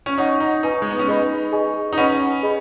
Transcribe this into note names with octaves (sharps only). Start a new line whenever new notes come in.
C#4
D#4 C#5 F#5 C#6
D#4
D#4 B4 G#5 C#6
G#3
B3
C#4
D#4 G#4 B4 D#5 B5
G#4 D#5 G#5 C#6
D#4
C#4 B4 F#5 B5
G#4 D#5 B5